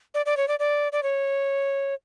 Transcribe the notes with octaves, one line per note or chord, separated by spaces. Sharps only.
D5
D5
C#5
D5
D5
D5
C#5